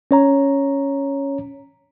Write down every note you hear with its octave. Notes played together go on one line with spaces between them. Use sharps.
C#4 C#5 A#5